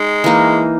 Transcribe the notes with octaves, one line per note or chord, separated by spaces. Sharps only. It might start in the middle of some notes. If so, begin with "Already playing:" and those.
Already playing: G#3 D#4
E3 A#3 D#4